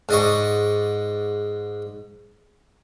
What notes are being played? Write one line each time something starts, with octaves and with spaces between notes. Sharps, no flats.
G#2 D5 D#5 C#6